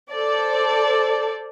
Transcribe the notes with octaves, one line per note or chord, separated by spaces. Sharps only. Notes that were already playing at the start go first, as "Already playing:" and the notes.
A4 C5 D5